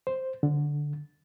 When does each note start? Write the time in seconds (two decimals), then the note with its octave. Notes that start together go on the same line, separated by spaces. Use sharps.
0.07 C5
0.43 D3